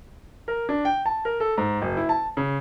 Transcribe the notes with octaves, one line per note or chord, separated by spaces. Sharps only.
A#4
D4
G5
A5
A#4
A4
G#2
F#1
E4
A5
C#3